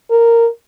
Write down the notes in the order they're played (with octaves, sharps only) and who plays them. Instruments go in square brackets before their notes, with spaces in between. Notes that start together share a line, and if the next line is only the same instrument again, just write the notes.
[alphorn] A#4